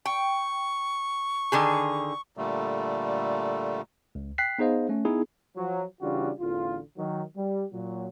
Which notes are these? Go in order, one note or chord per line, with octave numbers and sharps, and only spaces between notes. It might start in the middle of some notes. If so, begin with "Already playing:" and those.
G5 C#6
D3 D#3 G#4
A#2 D3 G3 A3
C#2
G5 F#6 B6 C7
B3 D#4 G#4 C5 D#5 F5
A3 C#4
B3 D#4 E4 G#4
F3 F#3
C#3 E3 G3 D4 F4 F#4
A1 E2 D3 F4
D#3 F#3
G3
A#2 F#3